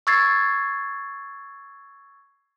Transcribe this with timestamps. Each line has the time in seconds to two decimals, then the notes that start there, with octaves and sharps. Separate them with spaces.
0.07 C#6 E6 G#6 A6 C7